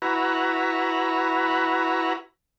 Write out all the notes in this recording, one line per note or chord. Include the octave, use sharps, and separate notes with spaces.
E4 F#4 B4 A#5